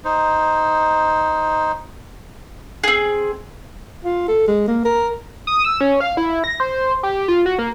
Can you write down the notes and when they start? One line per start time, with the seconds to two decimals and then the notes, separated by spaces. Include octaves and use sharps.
0.05 D#4 C5
2.84 C4 G#4
4.05 F4
4.28 A4
4.48 G#3
4.67 A#3
4.85 A#4
5.47 D#6
5.65 E6
5.81 C#4
6.00 F5
6.17 E4
6.44 A#6
6.60 C5
7.03 G4
7.28 F4
7.46 F#4
7.59 A#3